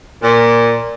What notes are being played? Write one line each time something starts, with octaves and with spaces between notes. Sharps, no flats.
A#2